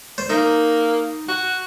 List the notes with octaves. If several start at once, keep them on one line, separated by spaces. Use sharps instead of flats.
C5
A#3 D#4
F#4